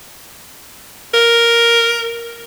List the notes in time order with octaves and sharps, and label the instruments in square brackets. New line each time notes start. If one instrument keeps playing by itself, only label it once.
[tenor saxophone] A#4